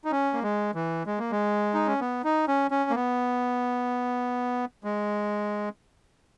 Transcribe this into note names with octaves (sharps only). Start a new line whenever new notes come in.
D#4
C#4
A#3
G#3
E3
G#3
A#3
G#3
D#4
C#4
B3
D#4
C#4
C#4
A#3
B3
G#3